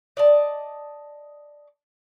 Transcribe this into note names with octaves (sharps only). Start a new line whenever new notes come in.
D5 D#5 A5